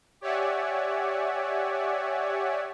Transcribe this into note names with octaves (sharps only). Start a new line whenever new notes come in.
G4 C#5 D5 E5 F#5 G#5